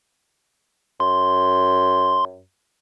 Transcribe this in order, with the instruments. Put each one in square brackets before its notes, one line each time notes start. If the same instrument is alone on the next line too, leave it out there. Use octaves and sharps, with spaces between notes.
[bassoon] F#2 [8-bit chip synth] C6